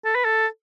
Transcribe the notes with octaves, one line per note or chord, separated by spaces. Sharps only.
A4
B4
A4